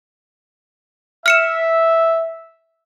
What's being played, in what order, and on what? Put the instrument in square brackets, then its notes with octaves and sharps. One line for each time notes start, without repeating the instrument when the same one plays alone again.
[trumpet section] E5 [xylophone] F6 C#7 E7